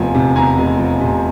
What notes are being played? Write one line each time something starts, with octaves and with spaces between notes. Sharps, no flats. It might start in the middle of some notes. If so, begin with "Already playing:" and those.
Already playing: F1 E2 F3 G#5
C3
E2 G#5 A#5
F1
F3
C3